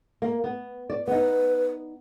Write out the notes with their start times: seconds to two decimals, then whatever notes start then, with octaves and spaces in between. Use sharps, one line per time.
0.22 A#3
0.44 B3
0.90 D5
1.07 B3 D#4 B4